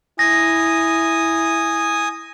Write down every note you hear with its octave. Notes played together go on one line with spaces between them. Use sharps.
E4 G#5 D#6 A#6